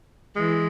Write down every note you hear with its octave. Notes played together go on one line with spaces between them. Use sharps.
E3 G#3